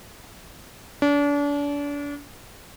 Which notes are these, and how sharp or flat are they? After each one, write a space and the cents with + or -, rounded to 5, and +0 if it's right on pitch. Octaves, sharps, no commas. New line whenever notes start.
D4 -35